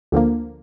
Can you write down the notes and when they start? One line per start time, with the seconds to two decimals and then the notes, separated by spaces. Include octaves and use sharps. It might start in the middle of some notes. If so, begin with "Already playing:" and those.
0.12 D2 D3 F3 A#3